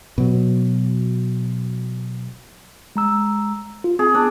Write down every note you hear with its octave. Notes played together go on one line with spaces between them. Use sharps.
B2 F#3
G#3 A#5 E6
F4
C4 G#4
B3 D4